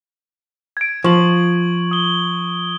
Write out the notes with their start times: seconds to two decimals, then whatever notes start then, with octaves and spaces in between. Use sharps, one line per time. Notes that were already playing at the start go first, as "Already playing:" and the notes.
0.77 G#6 D7
1.04 F3 C#6 F#7
1.91 D#6 G7